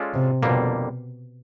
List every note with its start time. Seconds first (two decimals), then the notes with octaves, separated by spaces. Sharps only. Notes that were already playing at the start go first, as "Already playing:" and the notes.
Already playing: G#3 C#4 F4 A4 D5
0.14 C3
0.42 F2 B2 D3 G3 A#3